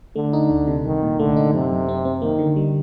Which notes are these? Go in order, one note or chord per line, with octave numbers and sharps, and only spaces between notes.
D3 A3
D#4
D2
C3
C2 D#3
A#2
D3 A3
D#4
F#2 C3
F#2
C4
C4
D#3 A#3
D3
G3